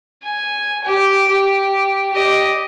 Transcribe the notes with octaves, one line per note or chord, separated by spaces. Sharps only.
G#5
G4
G4
G4 D#5